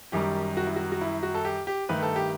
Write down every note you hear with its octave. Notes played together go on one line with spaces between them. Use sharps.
F#2 D#3 G3 G4
F#4
E4
F#4
F#4
E4
F#4
A4
G4
G4
G2 D#3 A3 B4
A4
G4